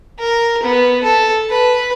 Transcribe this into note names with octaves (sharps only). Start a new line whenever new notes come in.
A#4
B3
A4
B4